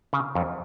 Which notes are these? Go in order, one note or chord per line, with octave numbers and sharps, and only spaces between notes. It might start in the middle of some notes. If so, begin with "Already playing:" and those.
C#3
F2